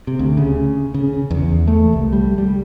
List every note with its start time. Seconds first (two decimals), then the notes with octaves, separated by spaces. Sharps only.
0.07 C3
0.19 D2
0.37 C#3
0.94 C#3
1.31 E2
1.68 A3
1.93 C2
2.13 G3
2.38 G3